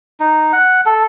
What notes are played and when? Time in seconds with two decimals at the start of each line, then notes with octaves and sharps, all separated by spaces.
0.20 D#4
0.53 F#5
0.86 A4